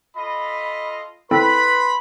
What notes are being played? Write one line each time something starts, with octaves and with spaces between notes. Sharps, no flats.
F4 A4 D#5 B5
C4 E4 A4 B4 B5 C6